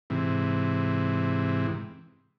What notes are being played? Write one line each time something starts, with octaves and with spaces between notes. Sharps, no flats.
G#2 C3 E3